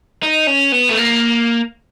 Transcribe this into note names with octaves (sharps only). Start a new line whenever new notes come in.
D#4
C#4
B3
A3
A#3